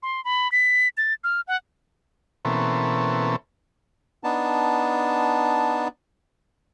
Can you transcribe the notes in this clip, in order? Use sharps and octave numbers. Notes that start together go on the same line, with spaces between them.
C6
B5
B6
A6
F6
F#5
B2 E3 A#3 C4 C#4 A4
B3 D4 D#4 A5